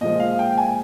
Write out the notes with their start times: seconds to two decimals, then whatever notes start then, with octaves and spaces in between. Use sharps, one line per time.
0.01 A#2 F3 G#3 D#5
0.20 F5
0.39 G5
0.58 G#5